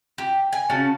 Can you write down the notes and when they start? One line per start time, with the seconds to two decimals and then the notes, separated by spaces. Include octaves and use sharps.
0.18 G4
0.52 G#5
0.70 C#3 C#4 F#4 A5